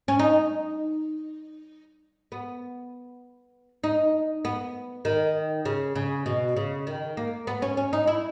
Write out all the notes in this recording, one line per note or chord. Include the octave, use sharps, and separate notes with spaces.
C#4
D#4
B3
D#4
B3
D#3
C#3
C#3
B2
C#3
D#3
A#3
B3
C#4
C#4
D#4
E4